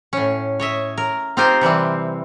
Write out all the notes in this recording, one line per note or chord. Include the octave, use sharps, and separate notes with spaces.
A2 C#4
C#5 D#5 E5
A#4
C4 D#4 F4 G4 A#4 C5
C3 E3 G3 C4